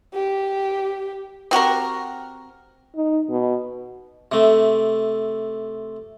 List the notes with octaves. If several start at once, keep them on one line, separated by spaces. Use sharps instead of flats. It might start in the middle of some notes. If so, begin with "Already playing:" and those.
G4
C4 F#4 G4 A#4
D#4
B2
C3 A3